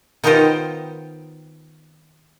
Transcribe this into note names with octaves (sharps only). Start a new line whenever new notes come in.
D#3 B3 D#4 F4 G4 C5